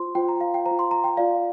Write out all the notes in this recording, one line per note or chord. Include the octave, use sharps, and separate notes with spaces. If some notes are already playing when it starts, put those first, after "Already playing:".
Already playing: F4 C5 C6
F4 C5 G5
A#5
F5
G5
C5 A#5
F4
C6
A#5
G5
F4 D5 F5